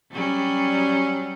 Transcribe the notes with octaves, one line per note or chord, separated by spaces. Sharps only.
F#3 G3 C#4